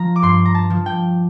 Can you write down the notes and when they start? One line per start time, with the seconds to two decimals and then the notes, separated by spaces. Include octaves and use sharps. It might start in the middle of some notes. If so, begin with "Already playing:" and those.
Already playing: F3 A#5
0.16 D6
0.22 G2 C6
0.45 A#5
0.55 A5
0.70 F3
0.86 G5